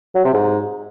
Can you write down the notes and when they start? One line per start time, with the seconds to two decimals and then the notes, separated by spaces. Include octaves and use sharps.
0.15 F#3
0.24 C3
0.34 G#2